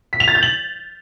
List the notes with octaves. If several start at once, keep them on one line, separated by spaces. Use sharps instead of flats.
B6
F7
A6
G6
F#7